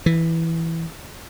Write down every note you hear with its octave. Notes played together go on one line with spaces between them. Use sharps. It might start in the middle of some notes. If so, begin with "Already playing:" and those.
E3